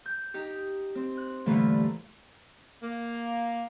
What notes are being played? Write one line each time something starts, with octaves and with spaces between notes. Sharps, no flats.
G6
D#4 G4
C4
F#6
G2 A#2 D3 E3 A3 A#3
A#3